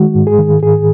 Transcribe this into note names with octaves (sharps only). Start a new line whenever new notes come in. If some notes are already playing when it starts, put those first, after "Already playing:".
Already playing: D#3 G#3 F#4
G#2
G#4
D#3
G#2 G#4